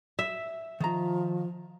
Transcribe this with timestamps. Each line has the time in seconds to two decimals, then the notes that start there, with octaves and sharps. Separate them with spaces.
0.19 E5
0.80 D#3 F3 A#5